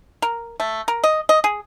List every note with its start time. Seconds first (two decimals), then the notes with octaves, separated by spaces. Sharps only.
0.22 A#4
0.60 A3
0.88 A#4
1.04 D#5
1.29 D#5
1.44 G#4